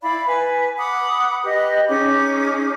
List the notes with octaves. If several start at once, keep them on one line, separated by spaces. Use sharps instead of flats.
E4 D5 F5 B5
B4 G#5
F#5 B5 D6 D#6
G4 B4 D#5
C#4 D#4 G#4 D6